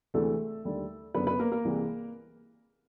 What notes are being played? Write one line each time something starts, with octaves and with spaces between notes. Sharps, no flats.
D2 C3 E3 G#3 A3 A4
D#2 D3 G3
F#1 F#2 D3 B3 B4
B3 B4
A#3 A#4
A#3 A#4
C2 C3 E3 G#3